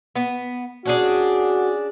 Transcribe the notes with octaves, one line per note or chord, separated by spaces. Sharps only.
B3
C#4 D4 F#4 G#4